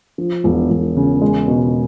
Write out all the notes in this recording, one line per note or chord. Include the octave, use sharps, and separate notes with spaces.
F3
E1
E1
C#3
G#3
B2